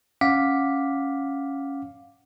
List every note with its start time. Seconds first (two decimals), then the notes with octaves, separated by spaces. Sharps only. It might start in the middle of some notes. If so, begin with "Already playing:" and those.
0.21 C#4 F5 F#5 D6 B6